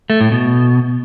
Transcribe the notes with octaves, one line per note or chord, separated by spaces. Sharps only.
A3
A2
B2